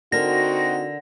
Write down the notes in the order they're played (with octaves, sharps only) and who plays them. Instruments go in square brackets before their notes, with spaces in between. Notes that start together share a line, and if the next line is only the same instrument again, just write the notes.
[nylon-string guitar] D3 A#4 [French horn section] C4 D#4 F#4 [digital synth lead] A#6